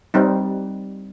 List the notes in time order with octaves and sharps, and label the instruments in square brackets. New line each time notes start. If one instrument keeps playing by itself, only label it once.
[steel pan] G3 C4 D#4